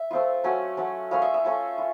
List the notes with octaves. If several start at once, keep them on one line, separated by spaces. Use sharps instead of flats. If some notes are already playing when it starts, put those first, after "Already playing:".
Already playing: E5
A3 C4 F4
F#3 A3 C#4
F#3 A3 C#4
A3 C#4 F4 F5
E5
E5
A3 C#4 F4
F4